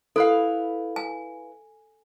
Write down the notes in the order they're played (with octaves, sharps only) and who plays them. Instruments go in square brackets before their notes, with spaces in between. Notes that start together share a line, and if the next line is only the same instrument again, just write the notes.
[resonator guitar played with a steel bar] E4 B4 F5 [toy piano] A4
[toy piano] G#5